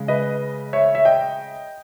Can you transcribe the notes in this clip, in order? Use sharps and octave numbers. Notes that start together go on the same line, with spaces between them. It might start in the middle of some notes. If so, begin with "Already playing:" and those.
Already playing: C#3 G#3
B4 D#5
C#5 E5
E5
D#5 G5